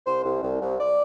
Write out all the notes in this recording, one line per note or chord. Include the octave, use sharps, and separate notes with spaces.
C2 C5
C2
C2
C2
D5